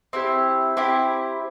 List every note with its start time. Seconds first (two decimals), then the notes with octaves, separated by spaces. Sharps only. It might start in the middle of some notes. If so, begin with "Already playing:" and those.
0.13 C4 E4 G4
0.77 C4 E4 G4